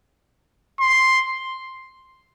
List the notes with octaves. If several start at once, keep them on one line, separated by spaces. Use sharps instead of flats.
C6